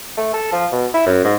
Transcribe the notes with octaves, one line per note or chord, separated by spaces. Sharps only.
A3
A4
F3
B2
E4
F#2
G#2